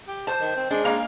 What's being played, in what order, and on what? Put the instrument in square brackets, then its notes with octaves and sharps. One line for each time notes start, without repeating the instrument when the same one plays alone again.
[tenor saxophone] G4
[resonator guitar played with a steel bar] C5 A5
[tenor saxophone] D#3
C4
[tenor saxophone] G#3 [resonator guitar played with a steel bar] D4
[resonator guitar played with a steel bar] A#3 F5 A#5